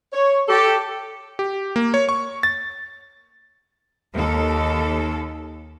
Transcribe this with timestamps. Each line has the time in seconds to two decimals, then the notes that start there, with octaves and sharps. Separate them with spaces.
0.13 C#5
0.49 G4 A4
1.39 G4
1.76 A#3
1.94 C#5
2.09 C#6
2.43 A6
4.14 D#2 A4